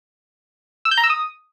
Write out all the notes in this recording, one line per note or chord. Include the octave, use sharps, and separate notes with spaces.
E6
G6
A#5
E6
D#6